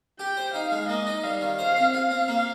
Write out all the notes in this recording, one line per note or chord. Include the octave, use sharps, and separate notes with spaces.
G4 G5
C5
D#4 F5
G#3
A#3 D#5
D#4
G3 F5
D#3
C5 F5
C4
F4 F5
C4
A#3